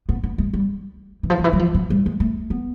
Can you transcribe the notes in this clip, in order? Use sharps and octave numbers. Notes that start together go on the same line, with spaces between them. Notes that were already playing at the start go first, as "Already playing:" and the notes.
B3
B3
G#3
G3
E3
F3
D#3
E3
F#3
F3
F#3
G3
G#3
A3
B3